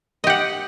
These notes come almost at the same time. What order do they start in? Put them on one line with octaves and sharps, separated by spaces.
D#5 G4 F#5